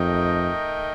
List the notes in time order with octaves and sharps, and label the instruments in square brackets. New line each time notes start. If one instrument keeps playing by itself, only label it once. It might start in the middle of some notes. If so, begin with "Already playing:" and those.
Already playing: [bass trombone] F2 [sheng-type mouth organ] A3 D#4 A#4 D#5 G5